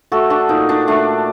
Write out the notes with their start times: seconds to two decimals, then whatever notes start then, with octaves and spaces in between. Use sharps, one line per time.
0.12 A3 F#4 A4
0.30 D4 F#4
0.49 A#2 D#4
0.69 D4
0.87 A3 D4